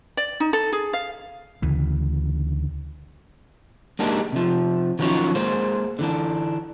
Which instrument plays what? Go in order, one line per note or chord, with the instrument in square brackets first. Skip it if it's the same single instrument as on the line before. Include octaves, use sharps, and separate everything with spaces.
[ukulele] D5
D#4
A4
G#4
F5
[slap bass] D2 C#3 E3
[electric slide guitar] G#3 A#3 D4 D#4 G4 A#4
C3 F3
D#3 F3 F#3 C#4 C#5
G#3 A#3 C5
D3 E3 D4